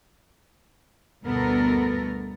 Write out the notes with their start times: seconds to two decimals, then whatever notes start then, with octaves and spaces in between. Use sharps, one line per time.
1.24 D2 G2 B2 B3 A4 A#4